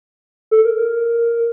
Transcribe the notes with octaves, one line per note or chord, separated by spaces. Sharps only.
A4
A#4
A#4